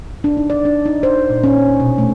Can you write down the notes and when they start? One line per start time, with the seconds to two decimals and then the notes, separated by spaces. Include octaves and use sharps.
0.24 D4
0.37 D#4
0.50 D5
0.65 D4
0.86 D#4
1.03 C5
1.30 A#2
1.44 C#4
1.80 B2
1.98 A3